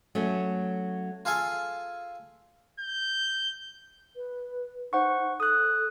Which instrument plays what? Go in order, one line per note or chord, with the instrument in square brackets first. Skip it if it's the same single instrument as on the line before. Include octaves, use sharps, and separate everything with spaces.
[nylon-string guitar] F#3 A3 C#4
[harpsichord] F4 G#4 A4 F5 G#5
[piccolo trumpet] G6
[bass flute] B4
[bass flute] D#4 [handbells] C5 F#5 C#6
[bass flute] A4 [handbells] D#6 F#6